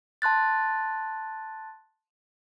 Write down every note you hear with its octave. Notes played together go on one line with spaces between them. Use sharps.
A5 C6 F#6 A6